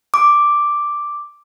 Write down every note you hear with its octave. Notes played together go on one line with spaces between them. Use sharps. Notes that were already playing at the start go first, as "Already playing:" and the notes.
D6